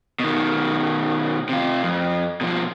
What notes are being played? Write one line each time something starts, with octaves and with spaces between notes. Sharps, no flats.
B2 D#3
C3 F4
F2
B2 F3